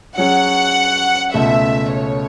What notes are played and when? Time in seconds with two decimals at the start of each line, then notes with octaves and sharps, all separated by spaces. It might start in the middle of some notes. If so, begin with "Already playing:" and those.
0.17 F#3 C#4 G#4 F#5
1.33 C#2 B2 A3 E5
1.93 C#5